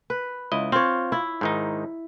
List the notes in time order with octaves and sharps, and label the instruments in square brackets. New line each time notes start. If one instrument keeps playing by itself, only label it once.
[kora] B4
[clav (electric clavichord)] C#2 E4 D#5
[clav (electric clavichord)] C4 [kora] F4 C#5
[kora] E4
[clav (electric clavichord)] G#2 D#3 D#4